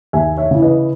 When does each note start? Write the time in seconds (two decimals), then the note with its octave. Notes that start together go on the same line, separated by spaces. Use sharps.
0.13 D#2 E5 G#5
0.37 C#5 E5
0.51 C#3 E3
0.62 B4 D#5